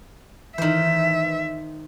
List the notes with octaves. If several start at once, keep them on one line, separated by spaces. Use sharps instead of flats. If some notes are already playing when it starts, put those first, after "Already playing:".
D#3 E3 C5 E5